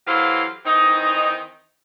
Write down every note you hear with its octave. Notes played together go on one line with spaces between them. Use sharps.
E3 F#3 G4 A4 C5 F5
D#3 E3 C4 D#4